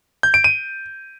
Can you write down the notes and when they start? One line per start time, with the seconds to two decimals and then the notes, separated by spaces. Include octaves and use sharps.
0.23 G6
0.34 D7
0.44 D#7